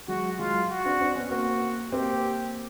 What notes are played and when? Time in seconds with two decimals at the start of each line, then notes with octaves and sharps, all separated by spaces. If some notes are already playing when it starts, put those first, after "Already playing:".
0.08 F#3 G#3 F#4
0.39 F#3 G#3 F4
0.70 F#4
0.85 C4 D4
1.00 C4 D4
1.16 B3 C#4
1.31 A#3 C4 F#4
1.92 A#3 C4 G4